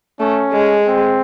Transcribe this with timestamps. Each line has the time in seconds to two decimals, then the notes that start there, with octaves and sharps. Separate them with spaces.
0.20 A3 C#4
0.53 G#3
0.86 C4